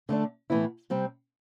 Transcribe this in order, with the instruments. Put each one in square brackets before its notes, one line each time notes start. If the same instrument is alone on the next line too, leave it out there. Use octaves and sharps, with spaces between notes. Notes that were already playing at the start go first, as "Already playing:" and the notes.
[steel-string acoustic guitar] D3 A3 D4
A2 E3 B3 E4
C3 G3 C4